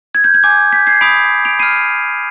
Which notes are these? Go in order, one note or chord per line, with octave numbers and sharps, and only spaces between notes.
G#6
G6
G#6
G#5 D6 G6
G6 B6
G#6 C7
B5 D#6 G6 B6 D7
D7 F7
B5 F6 C7 D#7